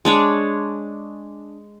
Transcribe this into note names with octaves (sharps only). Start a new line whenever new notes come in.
G#3 D4 C#5